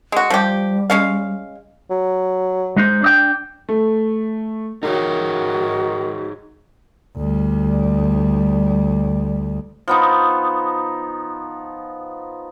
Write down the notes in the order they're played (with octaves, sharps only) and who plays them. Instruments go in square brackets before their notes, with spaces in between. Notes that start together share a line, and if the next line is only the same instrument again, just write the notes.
[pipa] G#3 F#4
[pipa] F3 G4 [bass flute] G3
[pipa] G#3 C#4 F5
[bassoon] F#3
[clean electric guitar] G#3 D#4 C5
D4 D#5 G5
[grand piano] A3
[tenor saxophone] D#3 [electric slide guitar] D#4 G#4 C#5 [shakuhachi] F#4
[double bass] D2 G3
[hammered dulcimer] F3 B3 D#4